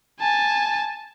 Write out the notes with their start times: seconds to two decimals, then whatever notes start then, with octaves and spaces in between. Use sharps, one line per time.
0.20 G#5 A5